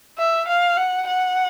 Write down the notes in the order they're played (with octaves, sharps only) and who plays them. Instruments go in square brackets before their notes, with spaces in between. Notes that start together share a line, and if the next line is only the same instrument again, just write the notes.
[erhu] E5
F5
F#5
F#5